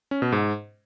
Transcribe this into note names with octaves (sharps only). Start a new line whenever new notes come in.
C#4
B2
G#2